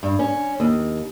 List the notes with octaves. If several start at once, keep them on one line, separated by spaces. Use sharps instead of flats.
G2
C#4
D#2